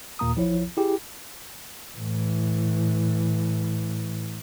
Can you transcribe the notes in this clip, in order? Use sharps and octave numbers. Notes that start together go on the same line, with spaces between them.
D#2 A#2 A#3 A#5 D#6
A#1 F3 E4 C#5
E4 G4 G#4
A2 E3